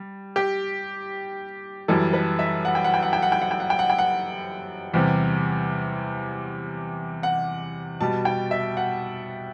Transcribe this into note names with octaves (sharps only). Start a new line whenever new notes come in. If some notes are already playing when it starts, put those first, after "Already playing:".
Already playing: G3
G4
F#2 E3 G3 A4
B4
E5
F#5
G5
F#5
G5
F#5
G5
F#5
G5
F#5
G5
F#5
G5
F#5
G5
F#5
E2 C3 G3
F#5
B2 G3 A5
G5
E5
F#5